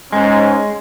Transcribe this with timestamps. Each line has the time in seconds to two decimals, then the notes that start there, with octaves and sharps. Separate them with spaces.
0.13 G#2 G#3 C#4